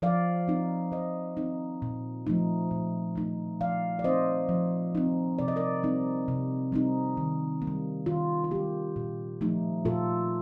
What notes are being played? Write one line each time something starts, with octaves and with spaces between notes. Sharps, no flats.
F3 D5 F5
C4 D#4
F3 C5 D#5
C4 D#4
A#2
F3 A3 D#4
A#2
F3 A3 D#4
F3 D5 F5
D5
C4 D#4 C5 D#5
F3
C4 D#4
C3 D5
D#5
A#4 D5
G3 C4 D#4
C3
G3 C4 D#4
D#3
A#3
G3
D#3 F4
F4
G3 A#3 G4
A#2
F3 A3 D#4
A#2 F4 A4